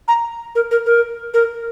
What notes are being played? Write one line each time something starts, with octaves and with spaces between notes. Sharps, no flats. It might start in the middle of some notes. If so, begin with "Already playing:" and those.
A#5
A#4
A#4
A#4
A#4